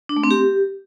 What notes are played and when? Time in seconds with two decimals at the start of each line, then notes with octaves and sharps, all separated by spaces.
0.09 D4
0.16 A3
0.24 C4
0.31 G4